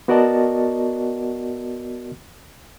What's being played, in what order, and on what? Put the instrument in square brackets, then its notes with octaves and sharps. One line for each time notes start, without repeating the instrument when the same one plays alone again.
[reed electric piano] B3 F#4 A#4 D5 D#5 A5